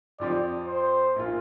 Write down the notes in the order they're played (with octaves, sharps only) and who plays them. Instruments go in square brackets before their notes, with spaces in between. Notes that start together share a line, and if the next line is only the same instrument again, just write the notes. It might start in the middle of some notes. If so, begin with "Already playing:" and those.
[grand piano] F2 F3 C4 G4 [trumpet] D5
[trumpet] C5
[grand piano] A#1 A#2 A#3 F4